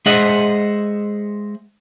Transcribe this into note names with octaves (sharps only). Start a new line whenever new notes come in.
G#3 G#4 C5 D#5 E5 F#5